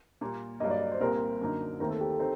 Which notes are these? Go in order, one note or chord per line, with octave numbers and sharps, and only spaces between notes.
A#2 G3 A#3
G2 F#3 A#3 D#5
D5
D5
C5
C2 A#2 G3 C4 A#4
F#2 D3 F#3 A#3 D#4
D#2 D#3 A3 C4 D#4 A#4
A4
G4
A4
C4 D#4 C5